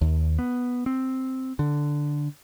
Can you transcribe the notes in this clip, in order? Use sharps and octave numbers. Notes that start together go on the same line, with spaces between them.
D#2
B3
C4
D3